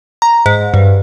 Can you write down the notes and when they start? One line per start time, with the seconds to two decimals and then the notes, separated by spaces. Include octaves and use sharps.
0.22 A#5
0.46 G#2
0.74 G2